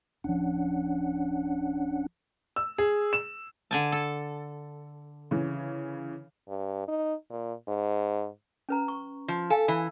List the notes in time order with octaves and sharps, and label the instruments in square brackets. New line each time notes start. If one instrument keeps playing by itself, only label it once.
[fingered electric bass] D1 F3 [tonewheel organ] C#4 D4 F#5
[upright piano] E6
G#4
E7
[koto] D3 G#5 A5
A4
[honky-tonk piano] C#3 E3
[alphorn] G2
D#4
A#2
G#2
[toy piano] C#4 B4 A#5
C#6
[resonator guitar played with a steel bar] F3
[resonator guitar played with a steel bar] A4 [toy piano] F5 G#5
[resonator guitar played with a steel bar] E3